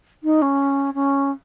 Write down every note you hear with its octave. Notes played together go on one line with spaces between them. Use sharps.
D#4
C#4
C#4